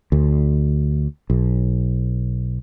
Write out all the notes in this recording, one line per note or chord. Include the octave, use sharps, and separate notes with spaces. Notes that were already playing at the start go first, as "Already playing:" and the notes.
D2
B1